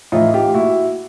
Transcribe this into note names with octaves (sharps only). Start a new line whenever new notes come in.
A2 E3 D#4 F4
F4 G4
A#2 E4 F#4